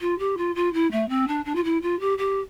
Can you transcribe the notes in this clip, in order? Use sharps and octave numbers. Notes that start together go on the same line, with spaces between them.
F4
G4
F4
F4
E4
A3
C4
D4
D4
F4
E4
F4
G4
G4